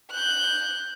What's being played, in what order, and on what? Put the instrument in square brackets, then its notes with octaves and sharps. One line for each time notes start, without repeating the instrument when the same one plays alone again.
[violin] F#6 G6